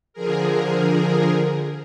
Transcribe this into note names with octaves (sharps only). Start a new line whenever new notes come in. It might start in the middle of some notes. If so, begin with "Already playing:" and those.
D3 F3 G#4 A#4